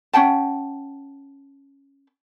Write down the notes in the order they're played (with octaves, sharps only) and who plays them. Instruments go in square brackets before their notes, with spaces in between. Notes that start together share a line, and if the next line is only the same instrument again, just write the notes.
[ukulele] C#4 F#5 G5 A5